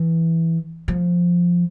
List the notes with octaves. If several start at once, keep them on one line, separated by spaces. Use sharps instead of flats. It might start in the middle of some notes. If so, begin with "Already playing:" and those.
Already playing: E3
F3